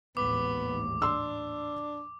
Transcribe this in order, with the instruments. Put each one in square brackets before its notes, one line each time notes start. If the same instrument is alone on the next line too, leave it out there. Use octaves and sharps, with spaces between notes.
[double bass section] A1 D#2 G#2 [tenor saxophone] B3 [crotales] D6
[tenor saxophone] D4 [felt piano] C6 E6